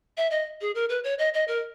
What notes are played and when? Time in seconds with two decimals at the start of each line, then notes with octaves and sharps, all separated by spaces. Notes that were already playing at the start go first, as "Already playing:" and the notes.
0.17 E5
0.31 D#5
0.61 G#4
0.75 A#4
0.89 B4
1.04 C#5
1.19 D#5
1.34 D#5
1.48 A#4